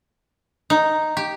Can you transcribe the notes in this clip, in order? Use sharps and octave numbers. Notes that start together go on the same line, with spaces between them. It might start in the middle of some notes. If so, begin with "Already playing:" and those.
D#4
G4